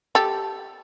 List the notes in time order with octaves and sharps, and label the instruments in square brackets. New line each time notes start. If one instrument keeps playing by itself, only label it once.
[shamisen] G4 A4